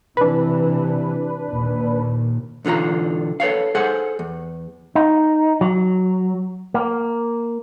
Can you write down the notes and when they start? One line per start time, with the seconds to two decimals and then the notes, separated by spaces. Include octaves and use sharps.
0.17 C3 E3 D4 B4
1.48 D#2 A#2
2.65 B1 D3 E3 F4 A#5
3.40 A4 B4 C#5 F5
3.75 G#4 A4 C5 F#5
4.19 E2
4.95 D#4
5.61 F#3
6.74 A#3